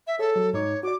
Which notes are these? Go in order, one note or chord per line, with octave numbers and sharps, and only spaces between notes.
E5
G#4 A4 C#5
F#3
G#2 D#4 C#5 D6
F#4 D5 D6